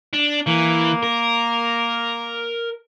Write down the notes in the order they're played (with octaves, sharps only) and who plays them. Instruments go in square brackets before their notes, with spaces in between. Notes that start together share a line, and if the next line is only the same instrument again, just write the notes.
[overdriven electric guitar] D4
[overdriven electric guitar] E3 [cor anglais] A#3
[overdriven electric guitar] A#4